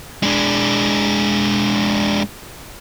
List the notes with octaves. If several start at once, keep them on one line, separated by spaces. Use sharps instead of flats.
G#3 D4